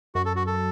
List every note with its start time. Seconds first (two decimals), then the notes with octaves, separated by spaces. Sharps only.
0.15 F#2 F#4
0.25 A4
0.36 F#4
0.47 A4